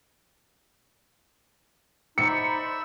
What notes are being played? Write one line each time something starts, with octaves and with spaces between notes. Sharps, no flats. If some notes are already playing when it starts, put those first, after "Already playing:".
D#4 C5 D5 E5 B5 E6 C#7